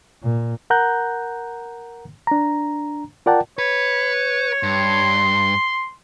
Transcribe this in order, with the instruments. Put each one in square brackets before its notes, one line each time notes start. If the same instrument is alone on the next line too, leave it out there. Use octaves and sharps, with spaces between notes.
[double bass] A#2
[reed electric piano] A#4 F#5 A#5 F#6 G6
D4 A#5
F4 A#4 D5 F#5 G5 A5
[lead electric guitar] B4 [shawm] C#5
[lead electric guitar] G2 [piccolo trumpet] C6